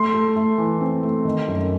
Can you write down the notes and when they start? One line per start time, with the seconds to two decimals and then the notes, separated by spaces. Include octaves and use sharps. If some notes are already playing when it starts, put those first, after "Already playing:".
Already playing: A3 C6
0.14 A3
0.36 A3
0.58 E3
0.81 C4
1.03 A3
1.25 D#3
1.48 F#2